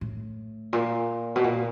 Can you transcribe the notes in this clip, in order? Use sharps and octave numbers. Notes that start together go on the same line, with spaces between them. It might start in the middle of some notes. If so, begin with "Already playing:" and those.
A2
A#2
B2
A#2